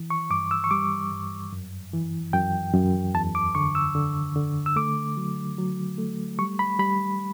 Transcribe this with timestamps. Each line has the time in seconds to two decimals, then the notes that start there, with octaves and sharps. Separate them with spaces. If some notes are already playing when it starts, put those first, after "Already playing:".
Already playing: E3
0.10 C#6
0.30 G2 D6
0.51 E6
0.64 C#6
0.71 G3 D6
1.12 G2
1.52 F#2
1.93 E3
2.33 F#2 G5
2.73 F#2
3.14 E2 A5
3.35 D6
3.55 D3 C#6
3.75 E6
3.95 D3
4.36 D3
4.66 E6
4.76 A3 D6
5.17 F#3
5.58 F#3
5.98 A3
6.39 G3 C#6
6.59 B5
6.79 G3 B5